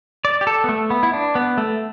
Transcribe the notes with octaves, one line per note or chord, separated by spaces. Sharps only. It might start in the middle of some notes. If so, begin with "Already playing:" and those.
D5
G4
A4
B3
A3
B3
E4
D4
B3
A3